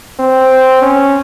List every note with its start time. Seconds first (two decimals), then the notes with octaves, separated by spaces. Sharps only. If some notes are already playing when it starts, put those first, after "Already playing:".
0.19 C4
0.82 C#4